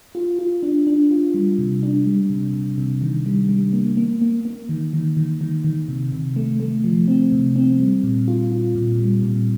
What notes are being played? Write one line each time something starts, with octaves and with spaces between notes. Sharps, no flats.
F4
F4
D4
D4
F4
G3
C3
D4
G3
C3
C3
C3
D#3
G3
G3
A#3
A#3
A#3
A#3
D#3
D#3
D#3
D#3
D#3
C3
C3
A3
A3
F3
C4
C3
C4
G3
A#2
F4
F4
A#2
G3
A#2